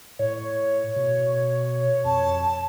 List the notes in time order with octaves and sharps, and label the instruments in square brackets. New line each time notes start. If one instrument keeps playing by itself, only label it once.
[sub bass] A2 [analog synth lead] C#5
[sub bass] B2
[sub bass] F2 [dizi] A5